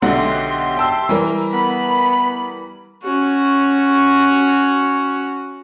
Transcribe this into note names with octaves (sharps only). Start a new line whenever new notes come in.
B1 D3 G4 E5 F#5 C6
G5 A5 E6
E3 G3 A#4
B3 B5
C#4 F#4